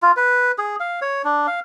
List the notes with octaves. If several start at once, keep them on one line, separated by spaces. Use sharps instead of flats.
F4
B4
G#4
F5
C#5
D4
F5